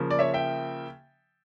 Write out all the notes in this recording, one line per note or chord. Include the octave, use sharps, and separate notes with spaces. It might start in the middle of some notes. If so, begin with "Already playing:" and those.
Already playing: C#3 F3 A#3
D5
C#5 E5
E5 G5